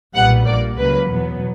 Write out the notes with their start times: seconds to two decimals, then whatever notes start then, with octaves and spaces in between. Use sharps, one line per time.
0.15 B1 A#2 G3 B3 F#5
0.46 A#1 A#2 A#3 D5
0.78 C#2 C#3 F#3 A#3 B4
1.09 E2 B2 F#3 B3